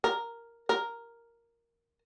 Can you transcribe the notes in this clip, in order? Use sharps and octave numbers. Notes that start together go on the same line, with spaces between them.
A#4
A#4